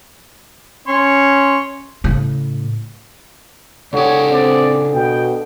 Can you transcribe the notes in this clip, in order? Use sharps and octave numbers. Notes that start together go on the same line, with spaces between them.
C#4 C#5 C6
A2 C#3
C#2 D3 G4 G#4 C#5
C4 D5
B2 G5